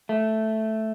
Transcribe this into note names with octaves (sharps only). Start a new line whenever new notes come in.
A3